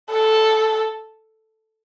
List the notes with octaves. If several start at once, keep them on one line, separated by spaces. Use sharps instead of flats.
A4